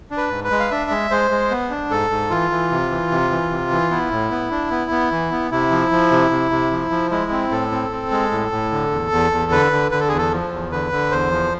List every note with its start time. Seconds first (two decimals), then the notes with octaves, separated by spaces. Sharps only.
0.11 D4
0.17 B4
0.30 G#2
0.44 B4
0.51 G#3
0.60 F5
0.71 D4 E5
0.90 G#3
1.11 G#3 C5
1.31 G#3
1.51 B3
1.70 D4
1.91 G#2 A4
2.10 G#2
2.30 E3 F4
2.51 E3
2.71 C3
2.90 E3
3.11 C3
3.31 E3
3.51 C3
3.71 E3
3.91 B3 E4
4.11 A2
4.31 B3
4.51 D4
4.71 B3
4.91 B3
5.12 E3
5.31 B3
5.51 C3 E4
5.71 F3
5.91 F3
6.11 C3
6.31 C3
6.51 C3
6.72 F3
6.91 F3
7.11 G#3 E4
7.31 C4
7.51 A2 A4
7.71 C4
7.91 C4
8.11 G#3
8.31 A2
8.52 A2
8.72 D3
8.91 E2
9.12 E2
9.32 E2
9.52 D3 B4
9.72 D3
9.91 D3 B4
10.00 A4
10.09 E2 G#4
10.18 A4
10.32 F3
10.52 E2
10.71 D3 B4
10.92 D3
11.11 E2 C5
11.31 F3